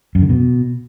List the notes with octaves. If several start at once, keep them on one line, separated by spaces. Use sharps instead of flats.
F#2
D3
B2